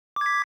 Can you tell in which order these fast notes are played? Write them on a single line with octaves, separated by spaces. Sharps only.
D6 G#6 B6